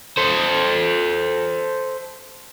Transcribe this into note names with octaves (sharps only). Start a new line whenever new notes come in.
A4 C5